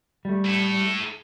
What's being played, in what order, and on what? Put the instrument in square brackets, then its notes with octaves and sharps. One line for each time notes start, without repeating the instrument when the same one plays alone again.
[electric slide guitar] G3 A3
[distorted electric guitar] E4 A4